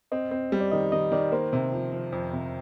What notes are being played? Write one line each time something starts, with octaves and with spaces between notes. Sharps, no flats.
C4 D#5
C4
G3
D5
D#3 D#5
D#3 D#5
D#3 D5
A#3 C5
C3
F3
F3
F2
C3